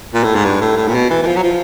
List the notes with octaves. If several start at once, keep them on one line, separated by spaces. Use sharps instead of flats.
A#2
A2
G#2
G2
A2
A2
A#2
B2
E3
E3
F3
F#3
F3